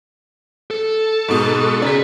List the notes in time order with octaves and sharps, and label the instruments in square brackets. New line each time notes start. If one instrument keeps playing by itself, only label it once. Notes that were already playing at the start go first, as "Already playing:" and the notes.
[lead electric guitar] A4
[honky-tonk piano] G#2 B2
[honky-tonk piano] C#3 B6 [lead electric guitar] D5 A#5